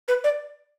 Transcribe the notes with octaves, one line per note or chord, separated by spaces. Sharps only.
B4
D5